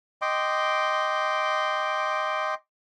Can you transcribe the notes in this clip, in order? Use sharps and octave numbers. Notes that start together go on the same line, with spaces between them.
D#5 G5 C6 D6